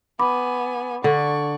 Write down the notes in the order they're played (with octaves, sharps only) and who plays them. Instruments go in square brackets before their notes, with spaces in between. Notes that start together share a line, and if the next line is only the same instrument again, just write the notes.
[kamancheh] B3 G#5 [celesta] B5 D6
[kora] D3 [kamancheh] D5 C#6